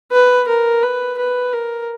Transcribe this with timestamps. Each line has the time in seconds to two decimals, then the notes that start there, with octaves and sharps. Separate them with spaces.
0.12 B4
0.48 A#4
0.83 B4
1.18 B4
1.53 A#4